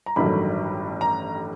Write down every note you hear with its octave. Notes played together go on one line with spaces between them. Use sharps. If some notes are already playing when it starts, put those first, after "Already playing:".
A#5
A1 G2 D#3 F#3 A3 B5
A#5